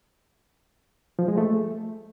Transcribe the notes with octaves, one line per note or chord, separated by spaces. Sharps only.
F3
G#3
A3